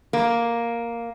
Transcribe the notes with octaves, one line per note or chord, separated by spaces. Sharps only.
A#3